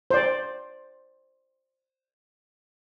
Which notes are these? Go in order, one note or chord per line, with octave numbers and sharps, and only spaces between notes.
C5 D5